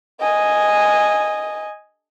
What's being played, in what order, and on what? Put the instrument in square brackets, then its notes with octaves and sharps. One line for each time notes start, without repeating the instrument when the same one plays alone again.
[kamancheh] D#5 G#5